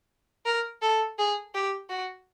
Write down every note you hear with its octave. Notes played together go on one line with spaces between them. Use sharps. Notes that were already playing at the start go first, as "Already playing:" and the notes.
A#4
A4
G#4
G4
F#4